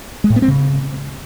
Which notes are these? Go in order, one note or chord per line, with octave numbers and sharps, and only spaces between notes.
G#3
A2
B3
C4
C#3